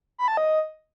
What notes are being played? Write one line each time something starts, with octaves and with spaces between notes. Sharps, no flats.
B5
A5
D#5